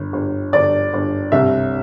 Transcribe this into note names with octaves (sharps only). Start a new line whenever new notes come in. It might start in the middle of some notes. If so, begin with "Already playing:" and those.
Already playing: G1
G1
G1 D5
G1
C2 E5